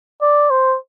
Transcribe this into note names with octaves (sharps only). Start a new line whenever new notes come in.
D5
C5